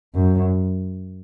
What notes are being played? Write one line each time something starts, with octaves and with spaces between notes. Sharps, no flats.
F#2